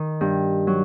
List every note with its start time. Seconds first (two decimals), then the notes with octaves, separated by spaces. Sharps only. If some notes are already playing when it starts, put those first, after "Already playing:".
Already playing: D#3
0.21 G2
0.67 F#3